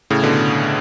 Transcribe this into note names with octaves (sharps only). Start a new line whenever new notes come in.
A2 C#3
B2 D3